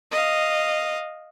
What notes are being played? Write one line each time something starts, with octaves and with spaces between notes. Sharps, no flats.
D#5 F5